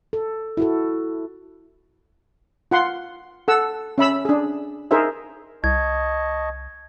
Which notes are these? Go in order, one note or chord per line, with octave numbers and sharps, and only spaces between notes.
A4
E4 F#4 A4
F4 F#5 C6
A4 F#5 E6
C#4 E5 B5 E6
D4 G#4
D#4 G#4 A#4 C5 E5
C2 D#5 A5 C#6 G#6